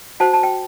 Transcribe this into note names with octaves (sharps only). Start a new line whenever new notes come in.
F#4 C5 F#5 A5
A5
G5